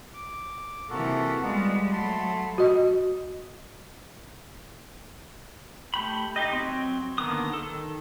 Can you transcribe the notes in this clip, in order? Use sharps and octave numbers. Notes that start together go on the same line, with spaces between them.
D6
C3 E3 A#3 F#4 A4
G3 G#3 B3 F4 F#5
F#3 A3 A5 B5 C6
F#4 D#5
A3 G4 B5
D#4 G4 D#5
F#3 C4
D3 D#3 A#3 B3 D#6
D#3 A4